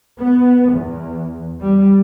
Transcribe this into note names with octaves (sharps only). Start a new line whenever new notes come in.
B3
E2
G3